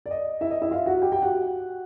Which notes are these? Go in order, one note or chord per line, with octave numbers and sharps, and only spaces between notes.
D5
D#5
E4 E5
D#5
E4 E5
F4 F5
F#4 F#5
G4 G5
G4 G5
F#4 F#5